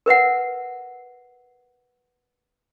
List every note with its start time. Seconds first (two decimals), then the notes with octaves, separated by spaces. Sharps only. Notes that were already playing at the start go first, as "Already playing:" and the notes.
0.06 A#4 B4 E5 F#5